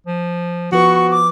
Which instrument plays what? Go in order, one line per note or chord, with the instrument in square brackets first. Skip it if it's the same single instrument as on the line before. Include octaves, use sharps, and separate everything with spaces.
[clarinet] F3
[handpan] F3 F4 B4 [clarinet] B3 [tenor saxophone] F#4 [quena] C#6
[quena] D6